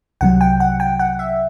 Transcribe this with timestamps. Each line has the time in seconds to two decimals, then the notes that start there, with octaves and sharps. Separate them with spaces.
0.21 C2 C3 F#3 F#5
0.41 G5
0.60 F#5
0.80 G5
0.99 F#5
1.19 E5